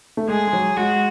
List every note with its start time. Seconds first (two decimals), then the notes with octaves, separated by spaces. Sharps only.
0.17 A3
0.28 G#3 G#4
0.47 G#3
0.53 F#3
0.77 G#3 F#4